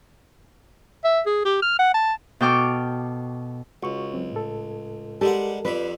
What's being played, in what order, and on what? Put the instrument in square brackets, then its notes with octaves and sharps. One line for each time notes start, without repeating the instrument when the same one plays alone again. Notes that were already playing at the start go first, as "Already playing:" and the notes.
[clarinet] E5
G#4
G4
F6
F#5
A5
[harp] B2 A4 G5 C#6 D6 F6
[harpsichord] C#2 [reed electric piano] F#4 C#6
[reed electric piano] F#3 C4
A2 A4
[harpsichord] G3 G#3 F#5 [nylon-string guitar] G4 [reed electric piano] A4 A#4
[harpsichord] F2 G3 B5 [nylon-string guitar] B4